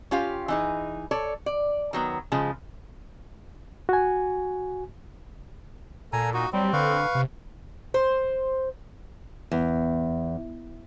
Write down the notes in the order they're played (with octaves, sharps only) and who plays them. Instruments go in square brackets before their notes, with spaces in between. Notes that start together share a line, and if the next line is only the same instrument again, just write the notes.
[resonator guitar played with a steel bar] C#4 F4 G4 F5
E3 D#4 G#4
A4 C#5 D5
D5
D#3 F#3 B3
C#3 F3 G#3
[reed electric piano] F#4 G#5
[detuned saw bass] A#2 [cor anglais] A4 [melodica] G#5 A#5
[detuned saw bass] A#2 [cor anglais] D#4 [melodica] F#4
[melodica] F#3 [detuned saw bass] G3 [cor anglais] C4
[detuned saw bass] D3 [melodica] B4 F5 C#6
[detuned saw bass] C3
[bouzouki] C5
[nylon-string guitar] E2